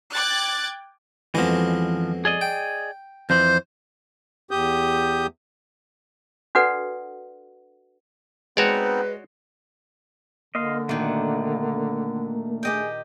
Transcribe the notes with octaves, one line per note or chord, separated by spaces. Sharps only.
G5 D6 F#6 G#6 A6
F2 B2 E3 F3 G#3
G#4 D5 D#5
G5
F2 E3 C5
E2 G4 D#6 G6
D4 F#4 A4 B4 D5 F#5
G#3 B3 C4 D#4 F#4 B4 C#5 D5
D3 A#3 D#5 F5 C6
A#2 D#3 A3 D4 F#4
G4 G#4 D#5 G5